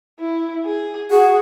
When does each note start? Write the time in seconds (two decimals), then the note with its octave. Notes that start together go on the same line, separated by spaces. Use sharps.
0.20 E4
0.65 G#4
1.11 F#4 G#4